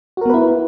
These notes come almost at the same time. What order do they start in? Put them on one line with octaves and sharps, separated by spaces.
F#4 A#4 B3 B4 E4